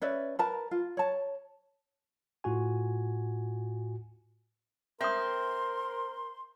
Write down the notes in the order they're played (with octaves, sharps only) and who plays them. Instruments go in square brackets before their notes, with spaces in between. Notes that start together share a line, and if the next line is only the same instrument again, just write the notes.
[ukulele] C#4 B4 D5 E5
A#4 B4 A5 A#5
F4
C#5 A5
[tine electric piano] A2 F4 F#4 G#5
[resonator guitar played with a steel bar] C4 [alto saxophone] A#4 [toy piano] E5 D#6 [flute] C6